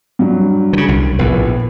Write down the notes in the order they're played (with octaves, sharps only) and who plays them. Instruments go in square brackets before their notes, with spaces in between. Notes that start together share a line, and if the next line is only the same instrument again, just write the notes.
[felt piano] G2 F#3
[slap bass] C#3 E3
C2
[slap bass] A#1 A2 [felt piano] B3